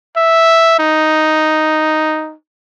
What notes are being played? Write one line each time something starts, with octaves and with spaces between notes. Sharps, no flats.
E5
D#4